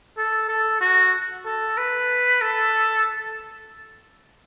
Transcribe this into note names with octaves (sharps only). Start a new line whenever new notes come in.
A4
A4
F#4
A4
B4
A4